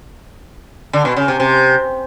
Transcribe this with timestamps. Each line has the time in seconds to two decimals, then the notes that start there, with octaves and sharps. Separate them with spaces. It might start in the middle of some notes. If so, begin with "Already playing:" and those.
0.93 D3
1.05 B2
1.17 C#3
1.28 C3
1.40 C3